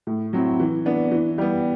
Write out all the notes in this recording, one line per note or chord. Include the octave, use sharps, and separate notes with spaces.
A2
F#3 C4 E4
E3
B3 D4
E3
G3 B3